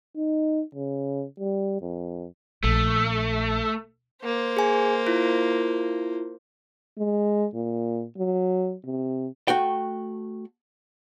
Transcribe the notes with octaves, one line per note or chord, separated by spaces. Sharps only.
D#4
C#3
G3
F2
A#1 A3
A#3 C5
G#4 G#5
E4 F4
G#3
A#2
F#3
C3
A3 F#4 G5